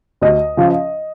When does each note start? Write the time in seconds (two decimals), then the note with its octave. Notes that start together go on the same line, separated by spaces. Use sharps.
0.21 D2 D#5
0.57 C#3 F3